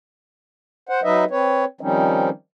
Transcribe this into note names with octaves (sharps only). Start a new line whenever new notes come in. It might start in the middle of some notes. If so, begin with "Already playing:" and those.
C5 F#5
F#3 D#4 B4 D#5 E5
C4 B4 C#5
D#3 F3 G3 C4 C#4 D#4